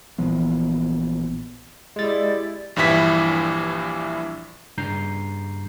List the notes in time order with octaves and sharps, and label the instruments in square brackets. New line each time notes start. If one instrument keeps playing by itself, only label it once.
[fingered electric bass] A#1 E3 F3 B3
[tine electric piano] G#3 A6 [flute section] E4 G4 D5
[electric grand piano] A#1 G2 E3 E4 B6
[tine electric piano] G2 C#3 A#5 G6 C7